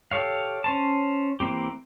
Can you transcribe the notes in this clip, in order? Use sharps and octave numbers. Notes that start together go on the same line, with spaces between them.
G4 A4 C#5 F5
C#4 C5 A5
E3 A#3 C4 G4